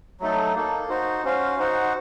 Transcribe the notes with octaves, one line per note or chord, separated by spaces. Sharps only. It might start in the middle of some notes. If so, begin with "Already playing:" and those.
F#3 A3 D#4 A4
A#3 D#4 A4
D#4 F#4 C5
C#4 F#4 C5 F5
D#4 F#4 C5 F#5